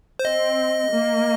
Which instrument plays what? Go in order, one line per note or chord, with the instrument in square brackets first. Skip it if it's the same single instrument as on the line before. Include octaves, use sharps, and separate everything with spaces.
[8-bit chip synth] C5
[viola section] C4 [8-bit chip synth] D#5
[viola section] A#3